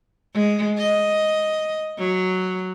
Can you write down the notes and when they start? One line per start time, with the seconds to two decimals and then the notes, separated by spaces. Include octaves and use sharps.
0.34 G#3
0.78 D#5
1.98 F#3